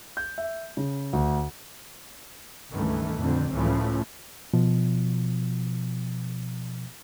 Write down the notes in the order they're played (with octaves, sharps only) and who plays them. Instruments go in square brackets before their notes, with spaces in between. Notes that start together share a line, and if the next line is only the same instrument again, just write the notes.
[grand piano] G6
E5
C#3
D2
[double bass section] C#2 G2 D#3 E3 A3
F2 A#2 D3 C4
C#2 A2 C#3 E3 F3 A3
[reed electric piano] B2 F3